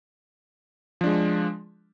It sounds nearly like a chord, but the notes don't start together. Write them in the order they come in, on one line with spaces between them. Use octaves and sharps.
F3 D4 G#3